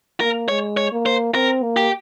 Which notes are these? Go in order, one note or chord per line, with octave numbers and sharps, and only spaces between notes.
A#3 A#4
G#3 C#5
C#5
A#3
C5
C4 A#4
A#3
G4